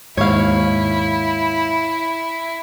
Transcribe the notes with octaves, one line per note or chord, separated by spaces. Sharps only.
D#2 G#2 E4 C#5 F5